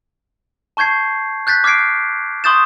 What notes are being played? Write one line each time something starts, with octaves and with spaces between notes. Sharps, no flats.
A5 C#6 G6 G#6 C7
F#6 G6 A6 B6
D6 F6 G#6 C7 D7
C6 C#6 D#6 G6 A6 E7